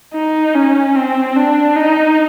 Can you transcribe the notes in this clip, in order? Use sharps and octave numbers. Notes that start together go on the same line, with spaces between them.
D#4
C#4
C4
D4
D#4